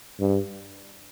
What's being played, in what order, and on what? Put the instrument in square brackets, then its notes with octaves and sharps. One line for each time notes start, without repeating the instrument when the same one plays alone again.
[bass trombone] G2